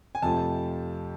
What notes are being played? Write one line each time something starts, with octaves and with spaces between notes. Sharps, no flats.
G#5
F2 C3 F3 A3 A5